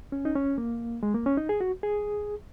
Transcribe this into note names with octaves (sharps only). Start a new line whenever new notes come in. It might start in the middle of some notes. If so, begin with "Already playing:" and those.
C#4
D#4
C#4
A#3
G#3
A#3
C#4
D#4
G#4
F#4
G#4